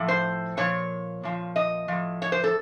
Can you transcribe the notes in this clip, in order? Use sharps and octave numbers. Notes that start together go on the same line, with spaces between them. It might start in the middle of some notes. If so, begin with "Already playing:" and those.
Already playing: A2 F3
C5
A#2 F3 C#5
A#2 F3
D#5
A2 F3
C#5
C5
A4